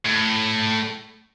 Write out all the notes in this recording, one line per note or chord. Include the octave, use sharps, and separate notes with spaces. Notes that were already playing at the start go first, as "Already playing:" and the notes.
A2